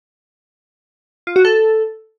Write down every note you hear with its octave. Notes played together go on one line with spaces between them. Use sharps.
F4
F#4
A4